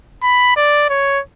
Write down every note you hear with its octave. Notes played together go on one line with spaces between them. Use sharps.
B5
D5
C#5